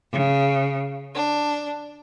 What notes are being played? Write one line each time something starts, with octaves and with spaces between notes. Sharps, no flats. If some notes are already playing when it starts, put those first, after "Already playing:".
C#3
D4